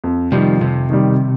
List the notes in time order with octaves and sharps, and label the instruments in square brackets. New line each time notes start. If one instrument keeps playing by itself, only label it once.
[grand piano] F2
[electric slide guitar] C3 F3 [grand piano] D#3 G3
[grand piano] F2 [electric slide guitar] C3
[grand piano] D#3 G3